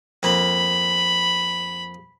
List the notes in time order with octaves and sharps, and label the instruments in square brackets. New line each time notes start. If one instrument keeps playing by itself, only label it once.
[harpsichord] F2 A#3 [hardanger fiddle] B5